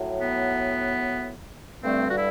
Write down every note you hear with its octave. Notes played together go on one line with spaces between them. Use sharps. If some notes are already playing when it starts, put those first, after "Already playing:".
Already playing: A2 F#3
B3
G2 D3 G3 A3 C4
F#4
E4